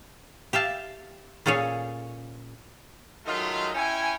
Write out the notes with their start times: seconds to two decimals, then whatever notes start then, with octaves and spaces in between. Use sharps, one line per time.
0.53 G4 E5 F5 A5
1.46 A#2 C#4 G#4 A4 C#5 F5
3.25 D#3 F#3 G#3 A3 F4
3.75 C#4 E4 G5 G#5